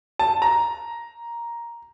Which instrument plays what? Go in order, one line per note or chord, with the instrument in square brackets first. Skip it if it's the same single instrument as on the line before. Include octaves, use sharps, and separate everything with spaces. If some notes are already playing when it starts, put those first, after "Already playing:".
[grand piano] A5
A#5